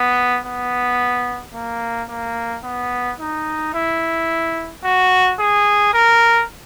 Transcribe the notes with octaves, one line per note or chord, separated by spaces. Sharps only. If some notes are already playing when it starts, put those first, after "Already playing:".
Already playing: B3
B3
A#3
A#3
B3
D#4
E4
F#4
G#4
A#4